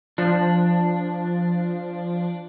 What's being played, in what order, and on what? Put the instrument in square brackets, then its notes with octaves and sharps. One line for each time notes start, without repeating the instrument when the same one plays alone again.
[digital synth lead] F3 [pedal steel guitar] D4